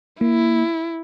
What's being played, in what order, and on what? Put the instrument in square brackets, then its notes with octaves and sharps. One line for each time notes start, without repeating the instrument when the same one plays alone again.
[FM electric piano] A#3 [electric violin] E4